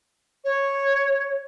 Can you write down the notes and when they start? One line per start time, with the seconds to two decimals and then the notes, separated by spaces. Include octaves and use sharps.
0.44 C#5